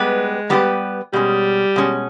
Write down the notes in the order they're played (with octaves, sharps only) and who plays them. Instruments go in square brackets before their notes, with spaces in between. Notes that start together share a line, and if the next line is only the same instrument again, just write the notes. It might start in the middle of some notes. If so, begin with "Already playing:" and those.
Already playing: [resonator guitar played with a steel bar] G3 B3 G4 B4 [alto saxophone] G#3
[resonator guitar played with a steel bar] G3 B3 G4 B4
[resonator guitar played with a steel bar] B2 G#3 C#4 [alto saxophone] G3
[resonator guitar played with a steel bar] B2 G#3 C#4